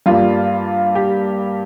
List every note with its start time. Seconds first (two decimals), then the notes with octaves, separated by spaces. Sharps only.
0.06 G2 G3 A#3 F4
0.95 G4